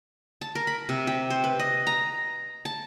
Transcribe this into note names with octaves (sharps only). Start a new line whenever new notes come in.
A5
A#4
B5
C3
G4
C5
B4
D#5
A#5
A5